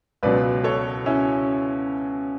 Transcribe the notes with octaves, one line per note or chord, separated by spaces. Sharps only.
C#2 B2 F#3 B4 D5
A4 C#5
C#4 E4